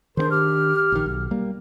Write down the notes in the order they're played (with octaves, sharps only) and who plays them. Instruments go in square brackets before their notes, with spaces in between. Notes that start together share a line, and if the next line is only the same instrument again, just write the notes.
[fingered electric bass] D#3 C4 D4 [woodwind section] G#4 A#4 C5
[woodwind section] G4 F6
[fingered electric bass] A#1 D#3
B1
G3 A#3